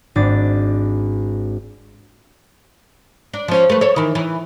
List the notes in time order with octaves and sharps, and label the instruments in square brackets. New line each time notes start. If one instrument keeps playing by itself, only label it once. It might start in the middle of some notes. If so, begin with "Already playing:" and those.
[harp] G#1 D4 A6
[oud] D4
F3 C#4
A3 B4
A4 C#5
D#3 E3
E3